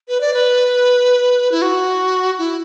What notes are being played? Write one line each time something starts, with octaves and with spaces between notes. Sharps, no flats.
B4
D5
B4
E4
F#4
E4